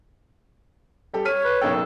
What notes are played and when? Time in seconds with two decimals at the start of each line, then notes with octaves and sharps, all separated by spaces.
1.13 G3 G4 A4
1.25 C#5 F6 B6 D#7
1.44 B4
1.61 F#1 B1 A4 G5